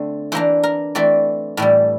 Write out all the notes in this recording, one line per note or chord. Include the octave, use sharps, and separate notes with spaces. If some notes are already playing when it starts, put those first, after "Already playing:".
Already playing: D3 A3 C4
E3 A#3 D4 C5
A#4
E3 A3 C4 D5
A2 E3 G3 D5